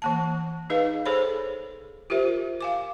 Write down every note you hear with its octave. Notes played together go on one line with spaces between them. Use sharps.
E3 A#3 A5
D#4 G#4 B4 D#5 F5
G#4 A4 C5 C#5 B5
F4 G4 A#4 C5 E5
F5 G#5 D6